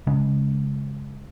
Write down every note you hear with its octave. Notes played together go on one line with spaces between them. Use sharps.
C#3 G#3 C#4